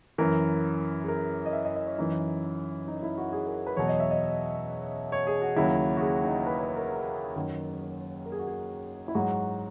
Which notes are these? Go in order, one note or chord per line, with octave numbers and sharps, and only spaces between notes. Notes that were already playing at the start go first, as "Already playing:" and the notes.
F#2 E3 A#4
G#4
A#4
D#5
E5
D#5
D#5
C#5
F#2 E3 D#4
D#4
E4
F#4
G#4
A#4
B4
E2 B2 F#3 C#5
D#5
E5
D#5
C#5
G#4
F#4
D#2 C#3 F#3 E4
F#4
G#4
D#4
B4
B4
A#4
F#2 D#3 F#3
A#4
G#4
F#4
G#4
E4
G#2 F#3 F#4